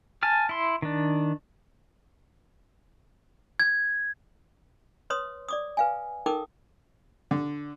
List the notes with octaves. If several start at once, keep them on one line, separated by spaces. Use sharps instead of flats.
G#5 A5 F6
E4 C6
D#3 D4
G#6
B4 C#5 C6 D#6
D5 D6 D#6
B4 F5 G#5
D#4 A4 A#4 G5 D6 D#6
D3